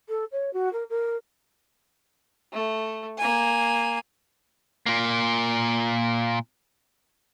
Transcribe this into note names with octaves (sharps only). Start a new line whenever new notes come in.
A4
C#5
F#4
A#4
A#4
A3
A#3 G#5
A#2 A#3